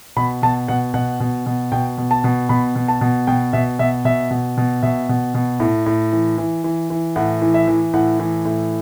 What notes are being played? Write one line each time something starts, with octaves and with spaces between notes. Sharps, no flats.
B2 B5
B2 A5
B2 F#5
B2 F#5
B2
B2
B2 G5
B2
A5
B2
B2 B5
B2
A5
B2
B2 G5
B2 E5
B2 E5
B2 E5
B2
B2
B2 E5
B2
B2
A2
A2
E3
E3
E3
E3
A2 F#5
E3
E5
E3
A2 F#5
E3
A2